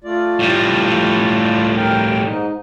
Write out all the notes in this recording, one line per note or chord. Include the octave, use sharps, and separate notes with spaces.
A3 F4 D5
A2 G3
A#4 G5
G#2 D#4